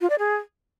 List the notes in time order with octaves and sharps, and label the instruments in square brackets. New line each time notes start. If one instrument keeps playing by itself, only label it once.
[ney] F4
D5
G#4